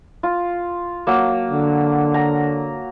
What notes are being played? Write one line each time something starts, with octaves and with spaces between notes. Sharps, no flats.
F4
F#3 A#3
D3
A#5